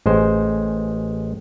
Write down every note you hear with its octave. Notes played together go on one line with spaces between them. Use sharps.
A1 G#3 C5